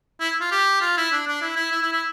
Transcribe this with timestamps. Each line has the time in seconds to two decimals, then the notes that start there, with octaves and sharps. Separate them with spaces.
0.20 E4
0.40 F4
0.51 G4
0.81 F4
0.97 E4
1.12 D4
1.27 D4
1.42 E4
1.56 E4
1.72 E4
1.82 E4
1.92 E4